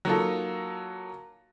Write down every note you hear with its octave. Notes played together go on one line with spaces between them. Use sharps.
F#3 A#3 D#4 F4 A4